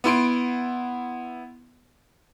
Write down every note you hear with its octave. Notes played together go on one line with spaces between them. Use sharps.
B3 E4 C6 D7